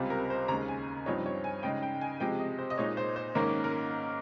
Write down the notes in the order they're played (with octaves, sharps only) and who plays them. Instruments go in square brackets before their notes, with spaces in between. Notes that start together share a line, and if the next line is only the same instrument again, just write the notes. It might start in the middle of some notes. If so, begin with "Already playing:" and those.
Already playing: [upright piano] C#2 C3 G3 C4 F4
A#4
C5
D#2 C#3 G#3 A#5
G#5
G2 F3 C4 D#4 C#5
C#5
G#5
C#3 G#3 D#4 G5
G5
G#5
C3 F3 G#3 G5
D#5
C5
D#5
A#2 G#3 D#4 C#5
C5
C5
G#2 D#3 A#3 C#4 A#4
A#4